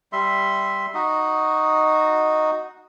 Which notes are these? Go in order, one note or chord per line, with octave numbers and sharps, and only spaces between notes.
G3 E5 C6
D#4 F#4 D#5